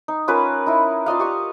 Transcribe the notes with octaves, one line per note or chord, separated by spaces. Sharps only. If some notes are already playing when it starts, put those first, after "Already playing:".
D#4
C#4 F4 A#4 B4
D#4 E4
F4 D5 D#5 F5
G4 C#6 D#6